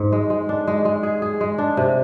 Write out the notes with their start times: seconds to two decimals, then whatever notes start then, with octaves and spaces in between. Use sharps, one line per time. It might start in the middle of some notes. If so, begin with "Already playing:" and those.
Already playing: G#2
0.12 G#3
0.30 G#3
0.49 D4
0.67 G#3
0.85 G#3
1.03 G#4
1.22 G#4
1.41 G#3
1.58 D4
1.77 C3